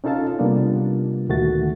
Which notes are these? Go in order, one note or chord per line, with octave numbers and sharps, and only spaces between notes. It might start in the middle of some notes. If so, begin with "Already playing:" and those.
C#4 D#4 F4 A4 F5 A5
C3 G3 A#3 B3 D4 F4
D2 A#2 D#3 A3 F#4 A6